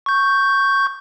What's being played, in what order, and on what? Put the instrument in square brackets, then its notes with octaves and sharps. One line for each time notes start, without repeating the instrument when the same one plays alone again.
[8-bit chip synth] C#6 G6